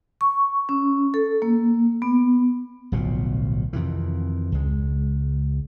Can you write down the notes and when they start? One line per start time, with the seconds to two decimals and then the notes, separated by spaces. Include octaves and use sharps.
0.21 C#6
0.69 C#4
1.14 A4
1.42 A#3
2.02 B3
2.92 D1 B1 B2 F3
3.73 F2 C3 D#3 E3
4.52 C#2 G#3